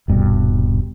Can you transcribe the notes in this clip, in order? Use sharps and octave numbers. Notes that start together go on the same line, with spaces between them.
D#1 G2 B2